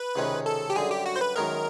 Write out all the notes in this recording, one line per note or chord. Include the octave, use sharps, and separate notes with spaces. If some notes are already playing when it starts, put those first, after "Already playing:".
Already playing: B4
C#2 C3 D#3 G#3 C#4
A4
G4
F#2 D3 G3 G#4
G4
F#4
C5
B4
F#2 D#3 G#3 B3 A#4